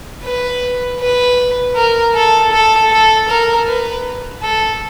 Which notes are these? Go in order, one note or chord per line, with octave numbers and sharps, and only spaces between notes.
B4
B4
A#4
A4
A4
A4
A#4
B4
A4